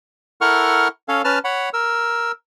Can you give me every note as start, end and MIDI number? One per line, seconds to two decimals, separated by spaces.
0.41 0.88 64
0.41 0.88 69
0.41 0.88 70
0.41 0.88 78
0.41 0.88 85
0.41 0.88 89
1.08 1.22 61
1.08 1.22 69
1.08 1.22 73
1.08 1.22 77
1.24 1.39 61
1.24 1.39 71
1.24 1.39 81
1.24 1.39 89
1.44 1.69 73
1.44 1.69 78
1.44 1.69 83
1.73 2.32 70
1.73 2.32 88